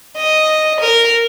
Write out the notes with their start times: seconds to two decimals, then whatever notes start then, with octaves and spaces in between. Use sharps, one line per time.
0.17 D#5
0.80 A#4